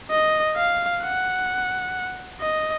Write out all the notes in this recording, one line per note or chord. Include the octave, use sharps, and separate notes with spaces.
D#5
F5
F#5
D#5